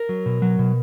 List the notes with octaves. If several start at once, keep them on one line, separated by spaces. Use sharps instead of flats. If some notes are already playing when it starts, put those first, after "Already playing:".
Already playing: A#4
F#3
B2
F#3
B2